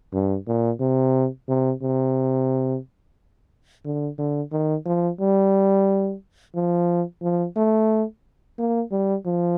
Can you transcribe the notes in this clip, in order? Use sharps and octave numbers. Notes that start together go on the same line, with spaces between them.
G2
A#2
C3
C3
C3
D3
D3
D#3
F3
G3
F3
F3
A3
A#3
G3
F3